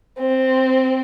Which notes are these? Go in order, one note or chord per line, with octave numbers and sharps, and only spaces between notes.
C4